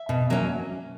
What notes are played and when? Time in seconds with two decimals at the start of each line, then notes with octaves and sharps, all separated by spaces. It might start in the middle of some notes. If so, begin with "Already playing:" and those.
Already playing: E5
0.09 B2
0.30 F#3 A#3 C#4